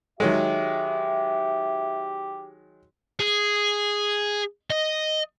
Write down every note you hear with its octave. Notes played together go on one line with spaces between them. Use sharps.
D#3 F#3 G#3 G4 E5
G#4
D#5